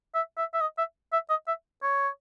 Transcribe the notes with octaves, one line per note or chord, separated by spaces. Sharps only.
E5
E5
E5
D#5
E5
E5
D#5
E5
C#5